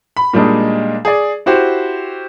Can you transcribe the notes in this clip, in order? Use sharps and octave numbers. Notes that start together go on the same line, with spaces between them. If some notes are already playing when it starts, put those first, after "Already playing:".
B5
A#2 G3 G#3 D4 D#4
G#4 D5
E4 F#4 G4 C5